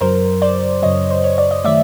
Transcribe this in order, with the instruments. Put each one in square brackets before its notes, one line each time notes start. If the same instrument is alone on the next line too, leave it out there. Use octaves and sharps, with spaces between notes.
[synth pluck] F#2 C#3 F#3 A#4 C5
C5 D5
F#2 C#3 F#3 C#5 D#5
C5
C#5
D5
D#5
D#3 F#3 A3 D5 E5